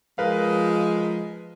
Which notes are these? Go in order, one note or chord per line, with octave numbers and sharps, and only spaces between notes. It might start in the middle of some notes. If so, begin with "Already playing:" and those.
F3 G#3 A#4 B4 F5